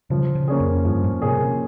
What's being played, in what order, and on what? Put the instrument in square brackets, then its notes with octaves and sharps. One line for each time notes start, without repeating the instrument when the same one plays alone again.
[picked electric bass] C#3 [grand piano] F3
[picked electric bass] C#3
[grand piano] A#3 C#4 G#4
[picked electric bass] F2
[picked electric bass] G2 [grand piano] F3
[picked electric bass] G#2
[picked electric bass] C3 [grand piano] A#3 C#4 G#4
[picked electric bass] C3